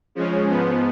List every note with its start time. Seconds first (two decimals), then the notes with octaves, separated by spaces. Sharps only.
0.15 C#3 F3 G#3 C#4
0.49 G#2 F3 B3